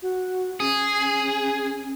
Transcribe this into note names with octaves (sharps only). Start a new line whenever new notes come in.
F#4
C#4 G#4